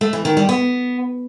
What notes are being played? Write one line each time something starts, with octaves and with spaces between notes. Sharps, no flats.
A3
E3
D#3
G3
B3